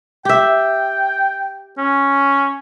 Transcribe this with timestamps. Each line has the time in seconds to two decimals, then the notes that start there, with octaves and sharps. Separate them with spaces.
0.25 G4 E5 G5
1.78 C#4